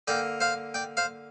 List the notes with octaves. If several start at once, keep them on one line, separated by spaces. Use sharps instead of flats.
D3 A#3 D5 G5
C5 F5
D5 G5
C5 F5